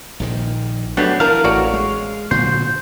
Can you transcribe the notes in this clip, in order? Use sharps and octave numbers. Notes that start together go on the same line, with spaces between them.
A#1 A#2 D#3
F#3 A3 B3 D4 G4
E3 A#4 F5 A5
A1 F#4 C#5 D5
G#3
A#2 D3 F#3 C5